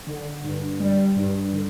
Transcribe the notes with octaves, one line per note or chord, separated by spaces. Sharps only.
D3
G2
G3
G2
D3